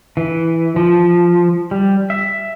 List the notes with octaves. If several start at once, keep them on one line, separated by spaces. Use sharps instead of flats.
E3
F3
G3
E5